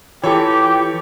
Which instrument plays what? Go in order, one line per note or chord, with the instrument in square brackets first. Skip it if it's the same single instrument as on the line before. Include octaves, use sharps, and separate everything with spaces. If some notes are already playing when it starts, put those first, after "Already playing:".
[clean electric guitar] E3 [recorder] F4 [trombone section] G4 [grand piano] A4 C#5